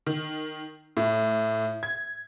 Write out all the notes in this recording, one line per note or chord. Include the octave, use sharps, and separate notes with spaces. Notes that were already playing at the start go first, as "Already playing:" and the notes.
D#3
A2
G#6